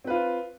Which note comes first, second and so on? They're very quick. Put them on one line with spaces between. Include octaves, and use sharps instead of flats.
C4 B4 F4